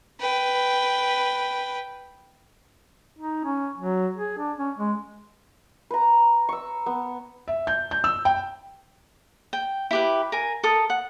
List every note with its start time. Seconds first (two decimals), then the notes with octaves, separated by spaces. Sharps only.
0.20 B4 G5
3.19 D#4
3.45 C#4
3.78 F#3
4.16 G#4
4.38 D4
4.58 C#4
4.78 G#3
5.91 B4 A#5
6.49 C#6 E6
6.86 B3
7.48 E5
7.67 G6
7.91 G6
8.04 E6
8.25 G5
9.53 G5
9.91 E4 G4 B4
10.32 A#4 G#5
10.63 A4 A#4 D#6
10.90 F#5